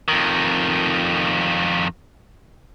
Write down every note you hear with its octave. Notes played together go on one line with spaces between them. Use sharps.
F2 D#3